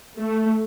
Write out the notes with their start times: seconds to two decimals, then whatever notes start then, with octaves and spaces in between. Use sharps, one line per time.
0.18 A3